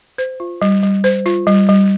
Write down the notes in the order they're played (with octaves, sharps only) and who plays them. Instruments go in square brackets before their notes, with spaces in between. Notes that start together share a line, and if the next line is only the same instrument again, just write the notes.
[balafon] C5
F4
G3
G3
C5
F4
G3
G3